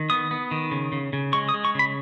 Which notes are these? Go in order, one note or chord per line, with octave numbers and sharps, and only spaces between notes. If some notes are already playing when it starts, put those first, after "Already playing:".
Already playing: D#3
B3 D#6
B3
D#3
C#3
C#3
C#3
G#3 C#6
D#6
G#3
C#6
C#3 B5